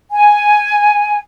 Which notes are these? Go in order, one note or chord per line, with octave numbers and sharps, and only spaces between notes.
G#5